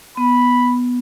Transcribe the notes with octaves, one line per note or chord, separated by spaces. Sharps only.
B3 B5